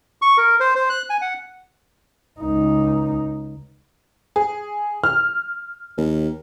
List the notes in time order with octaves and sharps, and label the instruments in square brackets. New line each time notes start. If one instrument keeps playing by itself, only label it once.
[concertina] C#6
A#4
C5
C5
F#6
G#5
F#5
[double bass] C#2 D#4
[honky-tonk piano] G#4
F6
[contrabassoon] D#2